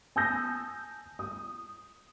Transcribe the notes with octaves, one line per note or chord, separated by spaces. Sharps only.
G#5 A5 D#6 E6 G6 A#6
D#6